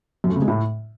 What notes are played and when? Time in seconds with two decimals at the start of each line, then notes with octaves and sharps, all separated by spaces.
0.24 F#2
0.30 A3
0.36 C#3
0.42 G#3
0.48 A2